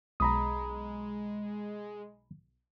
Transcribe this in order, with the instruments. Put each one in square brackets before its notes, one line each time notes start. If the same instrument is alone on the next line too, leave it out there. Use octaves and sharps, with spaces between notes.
[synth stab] B1 [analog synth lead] G#3 [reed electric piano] A#5 B5 D#6